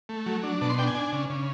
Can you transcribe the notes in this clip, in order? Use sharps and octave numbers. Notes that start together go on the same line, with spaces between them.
A3
F#3
D4
B2 A5
C6
D4 G5
G#5
D4
C#3
C#3